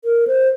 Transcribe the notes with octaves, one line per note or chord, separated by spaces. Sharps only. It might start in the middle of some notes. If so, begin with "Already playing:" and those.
A#4
C5